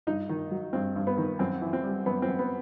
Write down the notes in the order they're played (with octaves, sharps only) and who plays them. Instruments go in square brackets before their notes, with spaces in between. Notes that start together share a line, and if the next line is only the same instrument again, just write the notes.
[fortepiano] G2 D#4
D#3
F#3
G2 C4
G2
B3
D#3
F#2 C4
E3
C4
G3
F#2 B3
C4
F#2
B3